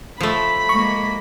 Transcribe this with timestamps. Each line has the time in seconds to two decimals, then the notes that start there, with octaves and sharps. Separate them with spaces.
0.20 F3 A3 B5
0.69 G#3 A#3 C#6